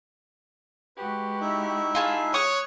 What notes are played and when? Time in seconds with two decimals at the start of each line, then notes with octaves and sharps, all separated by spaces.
0.97 G#3 F#4 G4 B4
1.41 D#4 E4 E5
1.95 F4 G#4 A5
2.34 C#5 C#6 D#6 F#6